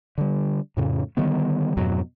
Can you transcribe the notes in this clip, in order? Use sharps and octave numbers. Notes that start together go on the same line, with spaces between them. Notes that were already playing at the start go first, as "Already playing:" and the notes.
D3 G3
F2 A2 C#3
D3 D#3 G3 B3
F2 G#2 B2 F#3